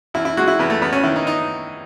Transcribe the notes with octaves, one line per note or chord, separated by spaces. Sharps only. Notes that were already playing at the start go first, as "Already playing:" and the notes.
E2 E4
E4
G#3 F#4
E4
E2 B3
A3
E2 B3
C#4
D#3 E4
D#4
D#4